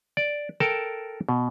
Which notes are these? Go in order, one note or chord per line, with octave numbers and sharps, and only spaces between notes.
D5
A4 A#4 G5 A5
B2